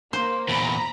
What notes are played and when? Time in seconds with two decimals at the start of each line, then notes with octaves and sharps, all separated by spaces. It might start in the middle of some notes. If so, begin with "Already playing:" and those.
0.13 A#3 C5 C6
0.49 E2 A#2 A#5 B5